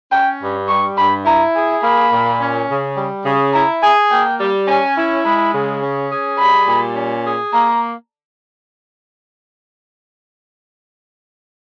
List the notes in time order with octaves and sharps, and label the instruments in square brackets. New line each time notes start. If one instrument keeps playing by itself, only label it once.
[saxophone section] C#4 [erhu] G5
[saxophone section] G2
[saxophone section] G3 [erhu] C#6
[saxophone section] G2 [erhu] B5
[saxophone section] E4 [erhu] A#5
[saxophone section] G#4
[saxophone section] A#3 [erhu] B5
[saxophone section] A#2
C#4
C#3
G3
C#3
[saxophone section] E4 [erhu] A#5
[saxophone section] G#4 [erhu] G#5
[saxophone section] A#3 [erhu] G5
[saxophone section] G3
[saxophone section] C#4 [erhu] G#5
[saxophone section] E4
[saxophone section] G#3 [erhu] B5
[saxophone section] C#3
C#4
G#4
[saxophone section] G3 [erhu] B5
[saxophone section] A#2
C#4
G#4
[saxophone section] A#3 [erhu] A#5